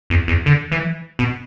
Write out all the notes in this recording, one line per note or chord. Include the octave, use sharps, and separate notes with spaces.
E2
E2
D3
E3
B2